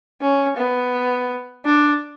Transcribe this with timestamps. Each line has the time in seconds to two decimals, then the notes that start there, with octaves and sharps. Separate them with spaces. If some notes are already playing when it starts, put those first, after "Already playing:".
0.21 C#4
0.57 B3
1.66 D4